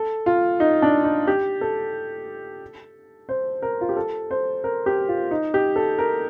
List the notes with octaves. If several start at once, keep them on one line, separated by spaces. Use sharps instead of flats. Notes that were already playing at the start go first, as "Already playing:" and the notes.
Already playing: A4
F4
D#4
D4
D#4
G4
A4
C5
A#4
F4
G4
A4
C5
A#4
G4
F4
D#4
G4
A4
A#4